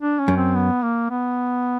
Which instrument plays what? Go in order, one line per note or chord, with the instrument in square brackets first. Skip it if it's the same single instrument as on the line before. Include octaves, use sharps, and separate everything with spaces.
[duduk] D4
C#4
[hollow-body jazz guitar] F#2
[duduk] C4
B3
A#3
B3